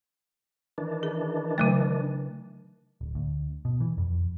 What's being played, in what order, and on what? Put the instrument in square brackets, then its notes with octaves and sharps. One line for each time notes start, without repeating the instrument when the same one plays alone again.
[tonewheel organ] D#3 E3 D4
[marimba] G#4
C#3 F#3 A3
[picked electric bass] D1
D2
B2
E3
F2